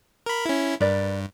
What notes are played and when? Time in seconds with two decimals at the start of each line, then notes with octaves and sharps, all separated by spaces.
0.26 A#4 B5
0.45 C#4 E4
0.80 G2 A#4 B4 D5